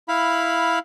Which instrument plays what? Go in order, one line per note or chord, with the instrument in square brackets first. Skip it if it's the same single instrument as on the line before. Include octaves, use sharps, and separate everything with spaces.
[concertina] E4 F5 B5